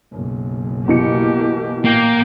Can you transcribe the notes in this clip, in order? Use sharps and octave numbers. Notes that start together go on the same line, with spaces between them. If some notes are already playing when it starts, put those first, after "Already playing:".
F#1 B1
B2 E3 A#3 G4 C#7
A1 A#2 A#3 G5